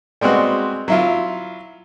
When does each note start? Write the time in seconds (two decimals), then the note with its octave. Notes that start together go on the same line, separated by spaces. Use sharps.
0.21 G3 G#3 B3 C4 F#4
0.88 F#3 E4 F4